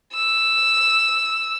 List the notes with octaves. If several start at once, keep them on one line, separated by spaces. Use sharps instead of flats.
E6